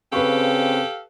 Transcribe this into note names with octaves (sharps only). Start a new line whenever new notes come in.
C#3 C4 G4 A4 B4 F5 C#6